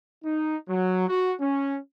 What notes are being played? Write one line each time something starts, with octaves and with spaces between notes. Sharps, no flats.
D#4
F#3
F#4
C#4